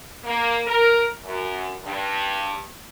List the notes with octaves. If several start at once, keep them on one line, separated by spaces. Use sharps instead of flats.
A#3
A#4
F#2
G2